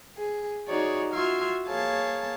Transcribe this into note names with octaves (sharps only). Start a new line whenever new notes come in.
G#4
D#4 F#4 G#4 C#5 D5
F4 F#4 E5 C6 F6 G#6
A#3 G#4 C#5 F5 A5